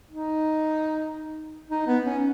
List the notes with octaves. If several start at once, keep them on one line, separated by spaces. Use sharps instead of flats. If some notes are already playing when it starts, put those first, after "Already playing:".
D#4
D#4
B3
C#4